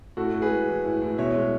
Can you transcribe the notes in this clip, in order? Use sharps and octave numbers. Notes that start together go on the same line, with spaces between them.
A2 F#4 A4
A2
G#4 B4
G#3
E3
A2
A2
B2 C#5 E5
G#3